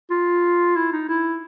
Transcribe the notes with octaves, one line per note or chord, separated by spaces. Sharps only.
F4
E4
D#4
E4